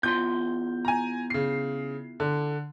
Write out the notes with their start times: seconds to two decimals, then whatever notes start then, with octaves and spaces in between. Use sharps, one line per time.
0.03 E2 F4 C6 G6
0.85 G#5 A#5
1.30 C#3 C7
2.20 D3